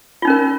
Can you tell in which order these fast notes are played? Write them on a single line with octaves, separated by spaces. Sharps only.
F4 D#4 C#4 A#4